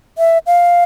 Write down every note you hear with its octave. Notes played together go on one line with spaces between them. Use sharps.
E5
F5